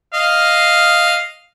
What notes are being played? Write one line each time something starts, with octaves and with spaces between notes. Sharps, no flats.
D#5 F5